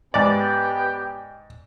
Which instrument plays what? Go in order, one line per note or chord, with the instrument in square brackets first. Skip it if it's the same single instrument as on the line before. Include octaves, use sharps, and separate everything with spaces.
[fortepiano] G#2 D5 [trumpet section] B3 G4 G5